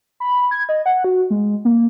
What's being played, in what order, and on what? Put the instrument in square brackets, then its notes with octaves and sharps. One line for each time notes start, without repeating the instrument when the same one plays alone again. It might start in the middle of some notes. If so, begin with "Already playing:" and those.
[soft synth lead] B5
G#6
D#5
F#5
F#4
G#3
A#3